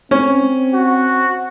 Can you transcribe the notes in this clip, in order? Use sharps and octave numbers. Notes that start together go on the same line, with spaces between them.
C4 C#4
F#4